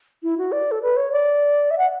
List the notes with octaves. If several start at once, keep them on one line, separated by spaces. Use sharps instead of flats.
E4
F#4
D5
A4
B4
C#5
D5
E5
F#5